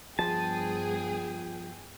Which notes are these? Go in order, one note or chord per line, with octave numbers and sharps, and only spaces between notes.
G2 F3 B3 G#4 G5 A5